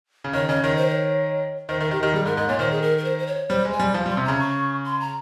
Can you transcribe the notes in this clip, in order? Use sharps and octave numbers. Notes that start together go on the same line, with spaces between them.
C#3
D#3 C#5
C#3 D#5
D#3 C#5
C5
C#5
D#3 C5
D#3 A#4
D#3 G4
D#3 G4
G3 G#4
G#2 A#4
G#2 D#5
A#2 C#5
D#3 C5
G#4
A#4
A#4
C5
C5
C#5
G3 C5
G#3
G#5
G3
F3
G3
C6
C3
C#3 A#5
C#6
C6
A#5